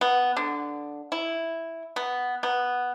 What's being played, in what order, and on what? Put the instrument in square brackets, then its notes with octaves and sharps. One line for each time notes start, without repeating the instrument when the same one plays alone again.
[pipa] B3
D3
E4
B3
B3